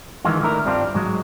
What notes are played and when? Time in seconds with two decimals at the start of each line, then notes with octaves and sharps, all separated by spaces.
0.25 D#3 E3 G#3 F4
0.41 D2 D3 D#3 E4 A#4
0.65 G2 G3 C4 D4 F4
0.95 G#2 F#3 G#3